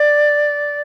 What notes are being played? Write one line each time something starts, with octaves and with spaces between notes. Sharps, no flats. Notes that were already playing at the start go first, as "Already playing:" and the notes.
Already playing: D5